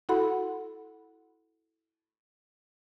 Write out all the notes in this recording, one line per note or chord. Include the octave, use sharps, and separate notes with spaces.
E4 F#4 A4 F#5 B5 C6